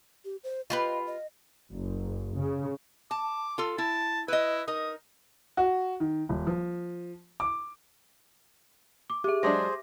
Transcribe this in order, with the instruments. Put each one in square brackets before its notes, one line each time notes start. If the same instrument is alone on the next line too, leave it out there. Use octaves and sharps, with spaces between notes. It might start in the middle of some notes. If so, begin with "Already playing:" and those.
[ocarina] G4
C5
[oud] F4 G4 B4 [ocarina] D#5
[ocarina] D#5
[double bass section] F#1
C#3
[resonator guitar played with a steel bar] A5 [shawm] D6
[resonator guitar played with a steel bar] F4 A4
[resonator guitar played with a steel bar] E4 [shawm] A5
[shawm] E4 [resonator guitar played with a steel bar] B4 D#5
[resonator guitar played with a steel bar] D#4 A#4 [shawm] D#6
[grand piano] F#4
D#3
D#1
F3
D6
[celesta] D6
[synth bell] G4 E5 [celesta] G#4 D6
[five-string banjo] F#3 G#3 D4 [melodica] G#4 C5 [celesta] D6 A#6